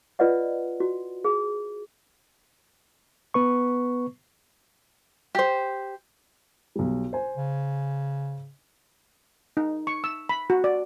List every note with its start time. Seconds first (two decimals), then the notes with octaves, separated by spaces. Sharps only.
0.19 F4 B4 D5 D#5 F#5
0.80 F#4
1.24 G#4
3.34 B3 B4 C#6
5.35 G4 C5
6.76 B1 G3
7.13 C5 G#5
7.37 C#3
9.57 D#4
9.87 C#6
10.04 E6
10.29 B5
10.50 F#4
10.64 D5